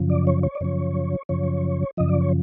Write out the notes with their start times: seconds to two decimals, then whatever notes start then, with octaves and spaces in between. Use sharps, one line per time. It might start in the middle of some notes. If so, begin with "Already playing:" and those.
Already playing: F#2 C#3 F3
0.10 D5
0.27 C#5
0.43 C#5
0.55 D5
0.61 F#2 C#3 F3 C#5
1.29 F#2 C#3 F3 C#5
1.97 F#2 C#3 F3 D#5
2.09 D5
2.21 C#5